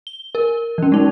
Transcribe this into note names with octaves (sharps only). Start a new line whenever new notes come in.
G7
A#4
E3 C#4
G#3 D#4